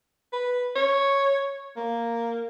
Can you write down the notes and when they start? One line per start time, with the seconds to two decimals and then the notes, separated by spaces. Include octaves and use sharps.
0.33 B4
0.76 C#5
1.77 A#3